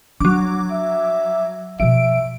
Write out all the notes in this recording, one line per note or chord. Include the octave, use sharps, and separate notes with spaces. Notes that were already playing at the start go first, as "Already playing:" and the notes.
F#3 D4 D6
E5
B2 F3 E5 D7